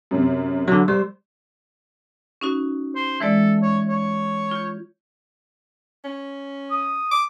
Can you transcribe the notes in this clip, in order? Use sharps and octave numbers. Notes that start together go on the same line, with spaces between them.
F#2 C3
D3 F#3
G3 C5
C#4 D#4 F#4
C5
E3 G#3 A4 D5
C#5
C#5
F4 G6
C#4
D#6
D6